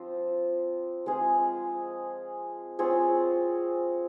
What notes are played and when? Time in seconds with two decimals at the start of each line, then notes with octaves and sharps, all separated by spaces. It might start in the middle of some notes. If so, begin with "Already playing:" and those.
Already playing: F3 C4 F4
1.06 G#3 C4 F4 G#4
2.79 C4 F4 G#4 C#5